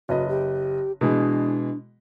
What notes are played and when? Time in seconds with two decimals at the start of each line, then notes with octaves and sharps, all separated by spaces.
0.09 F#1 F#4 B4 D#5
0.29 G4
1.01 B2 E3 G#3 D4